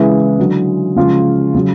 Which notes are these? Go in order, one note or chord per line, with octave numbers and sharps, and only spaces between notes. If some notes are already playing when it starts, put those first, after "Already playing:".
Already playing: C#3 E3 G#3 E4
D3 F#3
C#3 F3 G#3 F4
C#3 F#3